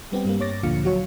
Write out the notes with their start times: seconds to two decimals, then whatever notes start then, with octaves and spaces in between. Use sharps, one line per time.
0.12 G3 B3 C4 G4
0.25 G2 G3 A#3
0.40 G2 C#5 D6 A6 A#6
0.63 D2 A#2 D3 F3 F5 C#7
0.85 F#3 F#4 C#5